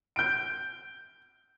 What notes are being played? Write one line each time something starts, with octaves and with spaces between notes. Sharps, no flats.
G6 D7